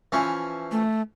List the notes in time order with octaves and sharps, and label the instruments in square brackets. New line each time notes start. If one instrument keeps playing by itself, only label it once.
[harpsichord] E3 F3 C#4
[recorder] A3